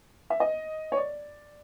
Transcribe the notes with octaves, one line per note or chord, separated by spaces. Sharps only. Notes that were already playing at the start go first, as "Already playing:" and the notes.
E5
D#5
C#5
D5